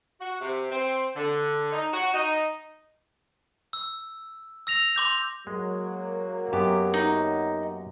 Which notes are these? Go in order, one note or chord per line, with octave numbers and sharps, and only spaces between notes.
F#4
C3
C4
D3
D#4
F#4
D#4
E6
E6 A#6 F7
C6 D6 G6 F7
F#3 G#3 A#3
F#2 B3 G4
D#4